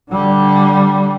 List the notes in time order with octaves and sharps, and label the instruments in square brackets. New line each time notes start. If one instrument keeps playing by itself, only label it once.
[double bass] D3 G3